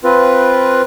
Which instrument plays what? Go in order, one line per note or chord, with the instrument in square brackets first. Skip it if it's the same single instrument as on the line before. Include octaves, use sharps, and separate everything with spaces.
[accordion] C4 F4 B4